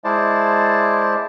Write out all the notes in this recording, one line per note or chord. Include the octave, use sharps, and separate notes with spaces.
G#3 E4 C5 D5 A5